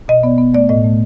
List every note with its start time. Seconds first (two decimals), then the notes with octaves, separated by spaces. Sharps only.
0.08 B2 D#5
0.23 B3 D5
0.38 B3
0.54 A3 D5
0.69 A2 D#5
0.84 A3